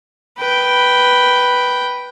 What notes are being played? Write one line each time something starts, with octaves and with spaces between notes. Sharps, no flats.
B4 G5